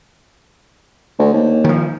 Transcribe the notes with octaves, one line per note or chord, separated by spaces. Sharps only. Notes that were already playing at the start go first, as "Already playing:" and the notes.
D2
D#2
D#3 F3